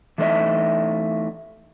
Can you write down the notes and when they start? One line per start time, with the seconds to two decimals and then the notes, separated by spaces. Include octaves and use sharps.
0.18 E3 A3 D#4 C5 D#5 E5